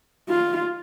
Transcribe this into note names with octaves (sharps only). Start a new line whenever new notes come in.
F4